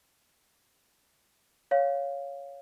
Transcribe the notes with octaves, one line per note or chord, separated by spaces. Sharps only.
C#5 F5